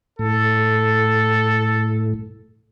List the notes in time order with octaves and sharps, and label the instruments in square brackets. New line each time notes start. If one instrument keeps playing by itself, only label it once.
[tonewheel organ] A2 [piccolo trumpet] A4